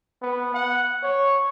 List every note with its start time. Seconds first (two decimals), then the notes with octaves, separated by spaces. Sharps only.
0.22 B3
0.54 F#5
1.03 C#5